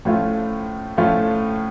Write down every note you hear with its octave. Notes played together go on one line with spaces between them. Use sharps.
A2 F3 A3 C#4 F4
A2 F3 A3 C#4 F4